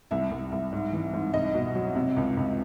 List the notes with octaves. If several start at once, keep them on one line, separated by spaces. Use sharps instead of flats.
C2 E5
C2
C2
G#2
E3
G#2
C2 D#5
B2
F#3
C3
C#2
C#2